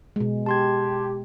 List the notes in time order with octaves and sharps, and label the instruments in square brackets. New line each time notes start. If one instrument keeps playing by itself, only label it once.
[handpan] B2 G#3
[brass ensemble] G4 [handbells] A5 C6 G#6